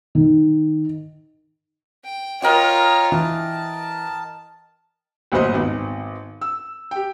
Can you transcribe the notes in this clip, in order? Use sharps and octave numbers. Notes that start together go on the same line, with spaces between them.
D#3
G5
F4 A#4 C#5 D#5 G5
E3 A5
G1 D2 A#2 F#3 C5 D#5
G#1 B3
E6
G4 G5